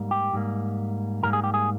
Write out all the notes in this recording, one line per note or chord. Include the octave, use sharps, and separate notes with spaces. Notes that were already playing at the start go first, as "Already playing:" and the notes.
Already playing: G#2 G3 A#3
G4
G#2 G3 A#3
G#2 G3 A#3 A#4
G#4
G4
G#4